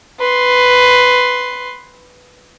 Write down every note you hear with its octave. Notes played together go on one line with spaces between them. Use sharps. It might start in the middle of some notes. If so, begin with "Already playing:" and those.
B4 C6